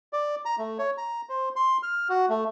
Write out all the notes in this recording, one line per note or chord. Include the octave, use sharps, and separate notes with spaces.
D5
A#5
A3
C#5
A#5
C5
C6
F6
F#4
A3